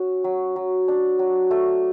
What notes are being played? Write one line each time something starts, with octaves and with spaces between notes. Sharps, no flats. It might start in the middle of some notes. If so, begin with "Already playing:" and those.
Already playing: C#4 F#4
F#3
F#3
D4
F#3
A3